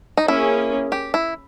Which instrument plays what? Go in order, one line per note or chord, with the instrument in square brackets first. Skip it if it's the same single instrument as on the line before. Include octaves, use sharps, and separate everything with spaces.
[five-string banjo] D#4
[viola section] A#3 C#4 G#4 [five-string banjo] E4
[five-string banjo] G4
E4